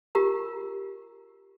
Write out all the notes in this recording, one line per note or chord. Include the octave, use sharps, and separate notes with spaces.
F4 G4 A#4 A#5